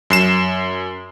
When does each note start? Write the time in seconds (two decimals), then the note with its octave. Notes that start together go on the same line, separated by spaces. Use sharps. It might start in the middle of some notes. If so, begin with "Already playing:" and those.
0.10 F#2 C7 E7